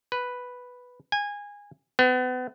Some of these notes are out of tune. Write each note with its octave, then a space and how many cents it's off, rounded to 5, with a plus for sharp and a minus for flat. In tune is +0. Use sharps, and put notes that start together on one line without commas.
B4 +0
G#5 -20
B3 +35